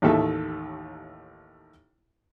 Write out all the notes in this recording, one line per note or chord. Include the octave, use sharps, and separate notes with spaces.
A1 D#2 D#3 A4 E5